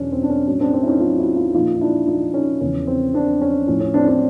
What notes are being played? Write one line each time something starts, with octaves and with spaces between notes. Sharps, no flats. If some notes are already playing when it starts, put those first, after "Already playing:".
Already playing: E2 B2 F#3 C#4 D4
C4
D4
C#4
A2 F#3 C#4
C4 D4
C4 D4
E4
C#4 D#4
D#4 F4
E4 F#4
D#4 F4
A#2 F3 D#4 F4
D#4
D4 E4
D#4 F4
C#4 D#4
E2 C#3 F3 C#4
C4
C4 D4
C#4
A2 F3 C#4
C#4
C4 D4
C4 D4